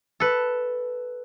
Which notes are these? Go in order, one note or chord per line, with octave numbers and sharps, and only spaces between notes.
A4 B4